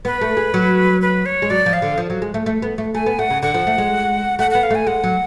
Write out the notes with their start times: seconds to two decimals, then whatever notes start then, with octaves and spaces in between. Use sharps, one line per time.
0.05 B3 B4
0.21 A3
0.37 G#3
0.54 F#3
1.02 B4
1.26 C#5
1.42 G#3
1.50 F#3 D5
1.66 F3
1.73 F5
1.82 D3
1.98 F3
2.10 F#3
2.22 G#3
2.34 A3
2.46 A3
2.62 B3
2.78 A3
2.95 A3 G#5
3.06 B3
3.19 A3 F#5
3.30 C#3
3.43 D3 F#5
3.54 F3
3.67 A3
3.78 G#3
4.39 A3 F#5
4.51 B3 F#5
4.63 F5
4.70 A3 G#5
4.87 G#3 F#5
5.04 F#3